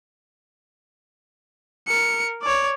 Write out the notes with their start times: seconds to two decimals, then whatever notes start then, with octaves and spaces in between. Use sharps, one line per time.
1.87 A#4 C#7
2.42 C#5 D5